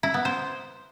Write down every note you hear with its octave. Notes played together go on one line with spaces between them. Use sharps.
E4
B3
C5